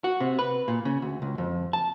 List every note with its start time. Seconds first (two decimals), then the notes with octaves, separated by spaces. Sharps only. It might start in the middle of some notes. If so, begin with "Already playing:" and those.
0.04 F#4
0.20 C3
0.39 B4
0.68 A#2
0.85 C#3
1.02 D2
1.22 C#2
1.38 F2
1.73 A5